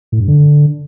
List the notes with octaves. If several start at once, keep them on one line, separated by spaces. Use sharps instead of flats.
A2
G2
D3